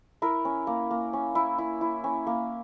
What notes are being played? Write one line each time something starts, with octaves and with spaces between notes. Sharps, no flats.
E4 A#4
C#4
A#3
A#3
C#4
E4
E4
E4
C#4
A#3